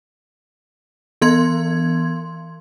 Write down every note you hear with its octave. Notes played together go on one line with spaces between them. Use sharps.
E3 B3 C6 G#6